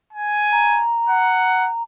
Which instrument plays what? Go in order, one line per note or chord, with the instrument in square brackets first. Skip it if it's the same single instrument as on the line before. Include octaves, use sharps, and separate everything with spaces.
[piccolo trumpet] G#5
[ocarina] A#5
[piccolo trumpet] F#5